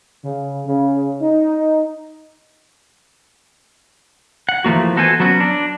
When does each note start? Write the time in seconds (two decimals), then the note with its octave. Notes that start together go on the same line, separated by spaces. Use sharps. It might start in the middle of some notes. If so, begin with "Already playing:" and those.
0.25 C#3
0.66 C#3
1.22 D#4
4.49 F#5
4.64 E3 F3 A3 A#3 F#4
4.96 B3 F#4 A4 C5 D5 G#5
5.20 F#3 B3 C#4 F#4
5.40 D4